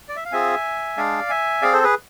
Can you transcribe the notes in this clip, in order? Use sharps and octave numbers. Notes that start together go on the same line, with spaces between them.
D5
E5
F5
C4 F4 G#4 E5 G#5
G#3 D4 G#4 D5 F5
E5 G#5
C4 G#4 D5 F5
A4 C5
G#4 B4